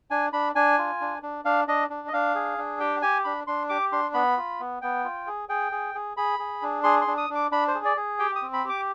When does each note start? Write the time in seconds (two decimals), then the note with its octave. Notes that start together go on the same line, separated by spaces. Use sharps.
0.10 D4 G#5
0.33 D4 B5
0.55 D4 G#5
0.78 F4
1.01 D4
1.23 D4
1.45 D4 F5
1.68 D4 D#5
1.90 D4
2.08 D#5
2.13 D4 F5
2.35 G#4
2.58 D4
2.80 G4 G5
3.02 G4 G#5
3.24 D4 B5
3.47 D4 C6
3.69 G4 D6
3.92 D4 C6
4.14 B3 B5
4.37 F4
4.60 B3
4.82 B3 G5
5.04 F4
5.27 G#4
5.49 G#4 G5
5.72 G#4
5.95 G#4
6.17 G#4 B5
6.39 G#4
6.62 D4
6.84 G#4 C6
7.01 C6
7.07 D4
7.17 D#6
7.30 D4
7.35 D6
7.51 D4 B5
7.68 C5
7.75 G#4
7.85 D5
7.97 G#4
8.19 G4 G5
8.35 D#6
8.42 C4
8.53 B5
8.65 G4 D6